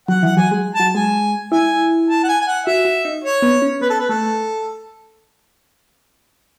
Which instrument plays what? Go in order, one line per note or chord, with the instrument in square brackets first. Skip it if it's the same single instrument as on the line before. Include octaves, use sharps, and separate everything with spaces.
[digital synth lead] F#3 [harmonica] F#5
[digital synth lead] E3 [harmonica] F#5
[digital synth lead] F#3 [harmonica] G#5
[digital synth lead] G#3
[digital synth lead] F#3 [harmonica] A5
[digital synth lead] G#3 [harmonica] G#5
[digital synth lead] E4 [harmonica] G#5
[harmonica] A5
F#5
G#5
G#5
F#5
[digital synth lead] F#4 [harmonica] E5
[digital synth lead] F#4
D#4
[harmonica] C#5
[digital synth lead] B3
C#4
[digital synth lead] B3 [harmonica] B4
[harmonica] A4
B4
[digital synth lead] A3 [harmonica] A4